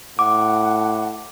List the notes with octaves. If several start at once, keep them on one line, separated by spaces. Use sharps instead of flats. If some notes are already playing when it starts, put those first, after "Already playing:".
A2 F#5 D6